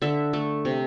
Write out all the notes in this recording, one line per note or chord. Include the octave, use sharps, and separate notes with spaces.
D3 E5
A3
C3